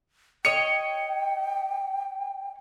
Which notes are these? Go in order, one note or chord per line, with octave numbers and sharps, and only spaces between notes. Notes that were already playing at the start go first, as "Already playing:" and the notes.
C#5 D#5 G5 C#7